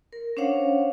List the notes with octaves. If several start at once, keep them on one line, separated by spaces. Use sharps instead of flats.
A#4
C#4 D4 C5 C#5 F5 F#5